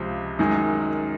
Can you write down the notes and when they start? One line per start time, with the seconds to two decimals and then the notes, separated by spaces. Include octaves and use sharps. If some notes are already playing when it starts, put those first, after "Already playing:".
Already playing: C#2 C3 F3 G#3
0.39 F#2 D#3 G#3